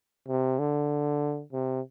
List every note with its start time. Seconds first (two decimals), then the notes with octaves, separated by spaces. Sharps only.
0.28 C3
0.59 D3
1.53 C3